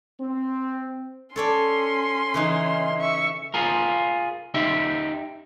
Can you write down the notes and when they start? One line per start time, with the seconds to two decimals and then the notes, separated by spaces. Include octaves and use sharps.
0.20 C4
1.36 C#4 A4 C#5 D5 C6
2.34 C#3 E3 D#4
2.98 E5 C#6
3.54 F4 G#4 A#4
4.54 D#4 G4 E5